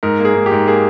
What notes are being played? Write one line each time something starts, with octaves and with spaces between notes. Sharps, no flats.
G#2 A#4
A#3
G#4
G#2
G4
G#2
A#3 G#4